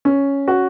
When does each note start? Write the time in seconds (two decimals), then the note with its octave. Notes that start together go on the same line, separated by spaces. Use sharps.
0.05 C#4
0.48 F#4